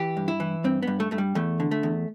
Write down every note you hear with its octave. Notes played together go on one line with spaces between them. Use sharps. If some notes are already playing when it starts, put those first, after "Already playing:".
Already playing: E3 G4
G2
E4
E3
G2 C4
G2 B3
A3
G2 A3
G3
E2 A3
D3
A3
E2